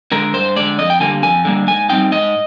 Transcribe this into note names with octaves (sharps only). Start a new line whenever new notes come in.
D3 G#3 A#4
G2 C5
D3 G#3 D5
F2 D#5
G5
D3 G3 A#3 G#5
F2 G#5
D3 G3 A#3
G#2 G#5
G3 C4 D#4 G5
G#2 D#5